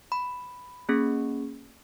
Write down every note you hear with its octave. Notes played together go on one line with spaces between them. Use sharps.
B5
A#3 C#4 G#4